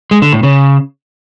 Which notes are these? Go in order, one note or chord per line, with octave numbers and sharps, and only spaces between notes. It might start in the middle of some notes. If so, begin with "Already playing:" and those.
G#3
D3
A2
C#3